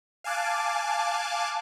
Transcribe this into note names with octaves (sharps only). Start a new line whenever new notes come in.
F5 G#5 A5 D6 F#6